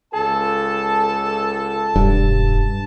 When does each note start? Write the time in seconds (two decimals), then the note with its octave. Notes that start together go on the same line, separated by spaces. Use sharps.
0.13 C#2 A4 A5
1.96 E1 G2